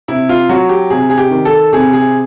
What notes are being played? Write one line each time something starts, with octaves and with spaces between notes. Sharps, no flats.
C3 E4
F4
F#3 F#4
G4
C3 G#4
G#4
G4
D#3
A4
C3 G#4
G#4